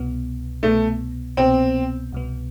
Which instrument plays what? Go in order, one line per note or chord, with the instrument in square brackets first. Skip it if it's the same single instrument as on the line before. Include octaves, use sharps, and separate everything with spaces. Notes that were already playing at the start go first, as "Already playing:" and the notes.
Already playing: [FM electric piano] C2 B2 B3
[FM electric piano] C2 B2 B3 [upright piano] A3
[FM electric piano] C2 B2 B3 [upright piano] C4
[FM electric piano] C2 B2 B3